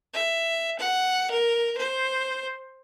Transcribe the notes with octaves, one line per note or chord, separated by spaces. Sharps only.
E5
F#5
A#4
C5